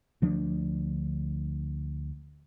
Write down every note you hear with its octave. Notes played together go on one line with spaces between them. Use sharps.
D2 F3 D4